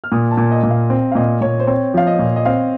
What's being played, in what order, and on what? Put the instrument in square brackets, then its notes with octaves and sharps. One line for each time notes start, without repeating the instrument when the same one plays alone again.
[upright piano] F6
[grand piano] A#2 [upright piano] D#6
[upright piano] A5
[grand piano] A#2
[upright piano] D#5
[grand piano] A#2
[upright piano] F5
[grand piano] C4
[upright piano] F5
[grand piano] A#2 [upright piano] D#5
[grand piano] A#2 [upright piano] C#5
[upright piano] C5
[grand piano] C4 [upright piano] C#5
[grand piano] F3 [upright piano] F5
[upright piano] D#5
[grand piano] A#2
[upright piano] D#5
[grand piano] C4 [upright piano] F5